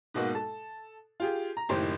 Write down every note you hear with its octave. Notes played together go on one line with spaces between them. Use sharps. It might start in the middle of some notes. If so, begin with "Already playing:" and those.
G#2 B2 A#3 F#4
A4
F4 G4 G#4
A#5
F#1 A2 D#3 G4 C5